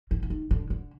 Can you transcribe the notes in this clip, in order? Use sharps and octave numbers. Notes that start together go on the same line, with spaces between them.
E3
E3
D#3
D3
D3